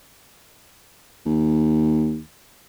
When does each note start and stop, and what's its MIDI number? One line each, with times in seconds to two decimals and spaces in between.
1.26 2.19 39